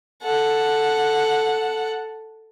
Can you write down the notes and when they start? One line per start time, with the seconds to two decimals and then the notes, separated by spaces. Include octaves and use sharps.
0.24 A4 F#5